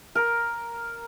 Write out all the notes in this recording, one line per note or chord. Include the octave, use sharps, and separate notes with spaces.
A#4